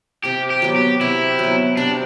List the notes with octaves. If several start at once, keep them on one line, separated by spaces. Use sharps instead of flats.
C3 G4
G4
F#3 B3
G4
C3 E4
F#3 B3
C3 D4